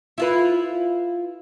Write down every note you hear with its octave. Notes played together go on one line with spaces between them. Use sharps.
E4 F4 B4